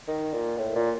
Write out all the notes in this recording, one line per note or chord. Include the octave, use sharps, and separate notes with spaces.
D#3
A#2
A2
A#2